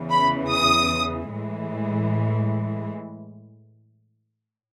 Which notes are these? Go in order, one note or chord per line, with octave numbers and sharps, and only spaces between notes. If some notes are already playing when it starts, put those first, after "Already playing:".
Already playing: E2 C#3 E3
B5
D#6
A2 E3 G#3